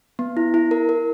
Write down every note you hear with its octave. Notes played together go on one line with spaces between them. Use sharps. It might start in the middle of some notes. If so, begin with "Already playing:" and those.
B3
E4
E4
A#4
A#4